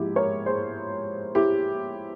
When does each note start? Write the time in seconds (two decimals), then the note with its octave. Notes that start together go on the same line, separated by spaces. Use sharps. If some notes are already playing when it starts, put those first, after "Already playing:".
Already playing: G#2 F3 A#3 E4 G4
0.16 A#4 C#5
0.46 G#4 C5
1.35 E4 G4